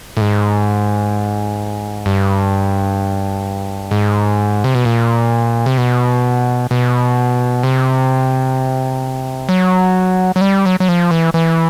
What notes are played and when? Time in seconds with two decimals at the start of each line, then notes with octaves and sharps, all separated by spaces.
0.17 A2
0.21 G#2
2.06 G2
3.91 G#2
4.64 C3
4.75 B2
4.85 A#2
5.66 C3
5.78 B2
6.71 B2
7.63 C3
9.49 F#3
10.36 F#3
10.41 G3
10.65 F#3
10.80 F#3
10.88 F3
11.11 E3
11.34 E3